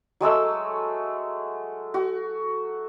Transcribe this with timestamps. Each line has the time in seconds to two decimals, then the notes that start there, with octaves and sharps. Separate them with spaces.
0.21 F#3 G#3 A3 E6
1.94 F#4